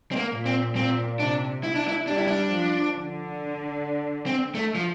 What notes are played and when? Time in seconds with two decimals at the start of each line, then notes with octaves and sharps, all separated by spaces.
0.12 C4
0.16 A#3
0.31 A#2
0.46 C4
0.75 A#2 C4
1.19 C3 D4
1.63 E4
1.75 D4
1.88 E4
2.07 G3 D4
2.18 E4
2.27 D4
2.51 F3
2.94 D3
4.26 C4
4.55 A3
4.75 F3